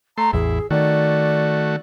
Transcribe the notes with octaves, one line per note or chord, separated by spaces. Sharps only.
A3 A#5 C6
A1 E2 E4 G#4
D#3 A3 F#4 D5